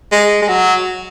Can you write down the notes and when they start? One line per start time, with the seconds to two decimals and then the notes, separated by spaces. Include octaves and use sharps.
0.12 G#3
0.42 G#3
0.48 F#3